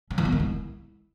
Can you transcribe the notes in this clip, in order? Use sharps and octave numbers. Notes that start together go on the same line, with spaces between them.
C#4
E3
B3
D#3
E4